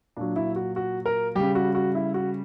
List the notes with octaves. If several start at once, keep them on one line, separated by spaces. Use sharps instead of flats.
A#2 F#3 D4
E4
F#4
F#4
A#4
C#3 G3 G4
F#4
F#4
E4
F#4